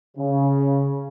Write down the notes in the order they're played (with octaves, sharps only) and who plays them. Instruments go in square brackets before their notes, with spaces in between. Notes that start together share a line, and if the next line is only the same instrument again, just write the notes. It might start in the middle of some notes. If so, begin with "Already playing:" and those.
[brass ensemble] C#3